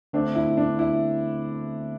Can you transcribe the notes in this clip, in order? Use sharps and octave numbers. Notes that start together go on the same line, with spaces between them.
D3 A3 C4 D4
E4
D4
E4